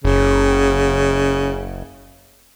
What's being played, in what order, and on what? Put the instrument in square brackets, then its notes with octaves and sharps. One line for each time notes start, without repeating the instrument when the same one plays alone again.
[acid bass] F#1 [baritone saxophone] C#3